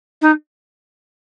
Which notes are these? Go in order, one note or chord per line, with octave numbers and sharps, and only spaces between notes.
D#4